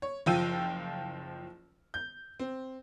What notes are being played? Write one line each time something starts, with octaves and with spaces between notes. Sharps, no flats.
C#5
F#1 F3 F4 G5 E6 D#7
G6
C4